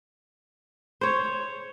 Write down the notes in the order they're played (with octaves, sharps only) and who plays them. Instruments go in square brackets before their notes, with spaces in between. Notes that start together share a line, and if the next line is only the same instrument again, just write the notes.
[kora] C5 C#5